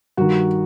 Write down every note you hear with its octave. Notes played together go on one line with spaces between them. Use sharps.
G2 D#3 F#4